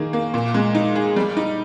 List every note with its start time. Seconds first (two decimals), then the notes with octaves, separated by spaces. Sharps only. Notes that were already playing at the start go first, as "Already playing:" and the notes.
Already playing: D#3 A#3 G#4
0.13 A#3
0.34 A#2
0.54 G#3
0.75 D#4
0.96 G#4
1.16 G3
1.37 D#4